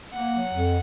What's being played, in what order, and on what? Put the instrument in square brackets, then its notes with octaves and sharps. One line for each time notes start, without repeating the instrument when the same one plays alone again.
[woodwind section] A#3 [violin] F#5
[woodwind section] F#3
F2